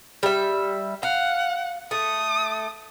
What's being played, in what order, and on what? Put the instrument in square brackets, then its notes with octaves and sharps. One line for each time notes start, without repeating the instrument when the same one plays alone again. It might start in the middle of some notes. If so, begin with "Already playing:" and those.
[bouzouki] G3 E5
[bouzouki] F5 [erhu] F#5
[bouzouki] A3 [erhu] D#6